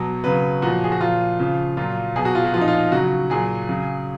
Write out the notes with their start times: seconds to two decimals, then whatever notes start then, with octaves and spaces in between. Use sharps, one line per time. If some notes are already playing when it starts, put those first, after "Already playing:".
Already playing: B2 F#3
0.24 C#3 F#3 B4
0.62 A#2 F3 F#4
0.84 G#4
0.92 F#4
1.00 A#2 F3 F4
1.39 C#3 F3
1.77 A#2 F#3 F4
2.16 B2 F#3 G#4
2.25 F#4
2.35 F4
2.44 F#4
2.54 F3 F4
2.57 A#2 D#4
2.68 F4
2.92 C#3 F#3 F#4
3.30 A#2 F#3 G#4
3.69 C#3 F#3